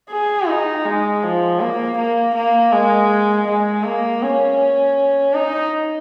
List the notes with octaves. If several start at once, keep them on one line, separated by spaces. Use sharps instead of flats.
G#4
D#4
G#3
F3
A#3
A#3
A#3
G#3
G#3
A#3
C#4
D#4